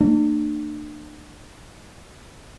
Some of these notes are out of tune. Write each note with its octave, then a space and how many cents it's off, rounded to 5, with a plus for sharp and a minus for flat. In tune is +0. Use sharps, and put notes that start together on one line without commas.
A#3 -40 D4 +40